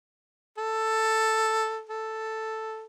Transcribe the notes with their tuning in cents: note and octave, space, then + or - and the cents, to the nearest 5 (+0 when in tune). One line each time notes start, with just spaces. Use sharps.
A4 +5
A4 +0